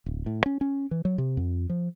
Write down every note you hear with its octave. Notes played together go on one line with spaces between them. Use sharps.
D1
A2
C#4
C#4
E3
F#3
C3
F2
F3